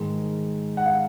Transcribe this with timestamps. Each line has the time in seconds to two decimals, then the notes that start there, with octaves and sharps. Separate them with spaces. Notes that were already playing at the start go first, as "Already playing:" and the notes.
Already playing: G#2 D#3 G#3
0.77 F#5
0.86 F5